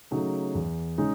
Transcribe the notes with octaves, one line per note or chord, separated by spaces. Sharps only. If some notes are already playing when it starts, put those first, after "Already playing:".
C#3 F#3 A3 D#4
E2
C#3 G#3 D#4